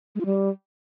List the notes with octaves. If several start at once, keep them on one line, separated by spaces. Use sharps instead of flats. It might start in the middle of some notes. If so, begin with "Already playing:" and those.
G#3
F4
G3